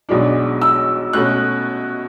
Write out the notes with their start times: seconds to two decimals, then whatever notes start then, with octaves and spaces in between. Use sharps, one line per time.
0.09 B1 B2 G#3 D4
0.61 E6
1.13 B2 A3 C#4 F#6